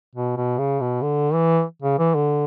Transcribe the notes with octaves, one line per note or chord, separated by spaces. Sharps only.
B2
B2
C#3
B2
D3
E3
C#3
E3
D3